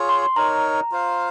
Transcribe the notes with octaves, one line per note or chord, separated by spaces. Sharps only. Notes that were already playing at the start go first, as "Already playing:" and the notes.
Already playing: F4 G#4 C#5
C6
D#4 A#4 C#5 A#5
F4 C5 F5